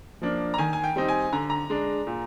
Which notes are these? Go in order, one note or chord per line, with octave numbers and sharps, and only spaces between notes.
F3 A#3 D4
A#5
D#3 G#5
G#5
G5
G3 C4 D#4
G#5
D3 A#5
A#5
G#3 D4
A#2